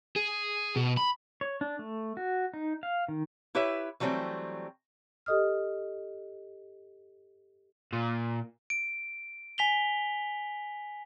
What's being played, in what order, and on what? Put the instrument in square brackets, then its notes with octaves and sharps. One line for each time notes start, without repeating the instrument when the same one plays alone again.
[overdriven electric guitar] G#4
B2
B5
[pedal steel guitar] C#5
D4
A3
F#4
D#4
F5
D#3
[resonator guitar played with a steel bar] E4 G4 B4 C#5 E5
E3 F#3 G3 A3 C4
[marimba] G4 A4 D#5 D#6 F6
[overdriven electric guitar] A#2
[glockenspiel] D7
G#5 B6 F7 G7